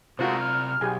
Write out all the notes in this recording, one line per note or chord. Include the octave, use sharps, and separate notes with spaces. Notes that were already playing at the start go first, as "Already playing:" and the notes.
C3 G#3 A3 F4 F#4 A#4 C5
F6
B1 G4 G#4 G#5